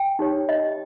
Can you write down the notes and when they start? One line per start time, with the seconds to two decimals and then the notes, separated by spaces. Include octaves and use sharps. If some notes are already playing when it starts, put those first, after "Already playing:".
Already playing: G5
0.19 D#4 G4 C#5
0.49 D#5